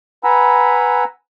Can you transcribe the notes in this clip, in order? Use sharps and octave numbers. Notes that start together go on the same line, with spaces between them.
B4 F#5 G#5 A#5 B5 E6